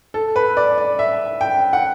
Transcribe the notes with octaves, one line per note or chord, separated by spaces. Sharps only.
A4
B4
D5
D5
E5
G5
F#5